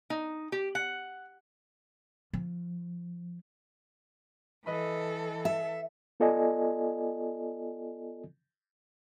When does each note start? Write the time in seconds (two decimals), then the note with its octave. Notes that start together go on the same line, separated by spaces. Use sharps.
0.10 D#4
0.52 G4
0.75 F#5
2.33 F3
4.66 E3 A4 B4 D#5 B5
5.45 E5
6.20 B3 F4 A4 D5 D#5 G#5